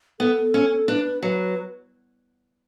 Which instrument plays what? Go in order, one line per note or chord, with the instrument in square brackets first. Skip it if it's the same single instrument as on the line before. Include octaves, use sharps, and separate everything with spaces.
[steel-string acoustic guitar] B3 [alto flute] A4
[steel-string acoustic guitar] C#4
[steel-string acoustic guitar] D4 [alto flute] B4
[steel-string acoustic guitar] F#3 [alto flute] B4